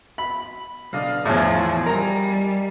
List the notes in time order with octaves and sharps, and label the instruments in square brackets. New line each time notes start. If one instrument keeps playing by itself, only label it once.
[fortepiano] B5
[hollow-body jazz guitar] B1 D3 [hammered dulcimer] D5 D#5 F5
[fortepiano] E2 A2 [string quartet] F3 [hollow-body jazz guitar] E4 F#4 C#5 [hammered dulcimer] G#4 A5
[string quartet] G3 [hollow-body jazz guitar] A#4 [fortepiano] A#5